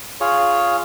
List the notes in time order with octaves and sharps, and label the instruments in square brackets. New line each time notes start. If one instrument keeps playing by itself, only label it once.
[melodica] F4 G#4 C#5